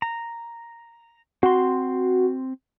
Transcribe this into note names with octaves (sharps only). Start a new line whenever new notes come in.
A#5
C4 F#4 C6